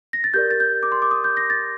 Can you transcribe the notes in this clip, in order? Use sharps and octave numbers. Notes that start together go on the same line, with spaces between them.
A#6
A6
G4 A#4 D5 G6
A6
G6
D6
C6
D6
D#6
G6
A#6
A6